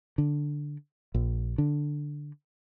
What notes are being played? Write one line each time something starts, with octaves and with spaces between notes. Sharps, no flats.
D3
A#1
D3